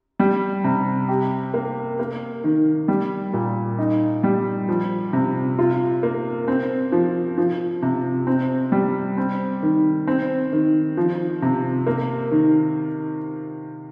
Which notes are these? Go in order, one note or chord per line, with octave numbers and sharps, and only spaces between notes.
G3
C3
G4
A#3
A#3
D#3
G3
A#2
D#4
G3
F3
C3
F4
A#3
C4
F3
F3
C3
C4
G3
C4
D#3
C4
D#3
F3
C3
A#3
D#3